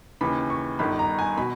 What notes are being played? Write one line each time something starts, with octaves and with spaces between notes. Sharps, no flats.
D#2 C#3 E3 B5
C#6
G1 G2 D#3 B5
A#5
G#5
B2 B5